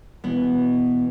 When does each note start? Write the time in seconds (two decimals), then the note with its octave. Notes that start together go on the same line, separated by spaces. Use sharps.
0.24 B2 E3 B3